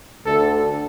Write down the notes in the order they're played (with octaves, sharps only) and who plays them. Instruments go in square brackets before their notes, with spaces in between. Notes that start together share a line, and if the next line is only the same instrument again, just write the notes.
[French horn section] D2 D3 [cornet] A4